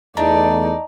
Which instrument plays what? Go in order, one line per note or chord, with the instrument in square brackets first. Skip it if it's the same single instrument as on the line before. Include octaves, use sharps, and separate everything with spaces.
[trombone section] E2 A3 [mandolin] D4 [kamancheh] D#4 D5 [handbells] D#5 A#5